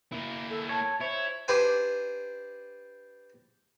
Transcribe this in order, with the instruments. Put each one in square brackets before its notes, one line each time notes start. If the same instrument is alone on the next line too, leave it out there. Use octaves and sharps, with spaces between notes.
[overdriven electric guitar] A#3 E4
[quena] A4
[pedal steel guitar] C#5 [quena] A5
[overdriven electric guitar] E4 [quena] C5 [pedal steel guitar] C#5
[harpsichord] D4 G4 B4 C5 G#5